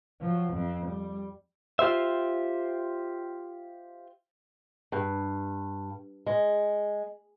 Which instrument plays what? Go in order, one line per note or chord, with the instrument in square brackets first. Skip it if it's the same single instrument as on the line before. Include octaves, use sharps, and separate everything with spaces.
[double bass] F3 F#3
F2 C4
G3
[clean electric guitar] F4 G4 C5 E5
[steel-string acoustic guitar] G2
G#3